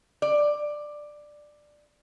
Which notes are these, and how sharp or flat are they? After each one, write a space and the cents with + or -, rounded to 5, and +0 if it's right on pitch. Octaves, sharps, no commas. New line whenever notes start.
D5 +10